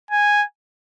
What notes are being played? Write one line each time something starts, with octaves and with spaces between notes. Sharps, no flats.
G#5